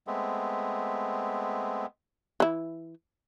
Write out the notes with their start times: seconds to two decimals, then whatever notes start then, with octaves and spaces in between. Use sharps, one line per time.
0.07 G#3 A3 B3 C4
2.40 E3 E4